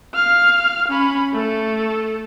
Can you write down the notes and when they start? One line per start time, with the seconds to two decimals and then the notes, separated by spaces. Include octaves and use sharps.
0.14 F5 F6
0.89 C#4 B5
1.33 A3 A4